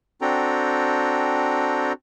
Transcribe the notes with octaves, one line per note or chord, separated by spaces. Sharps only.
C4 D4 F#4 A4 G5 A#5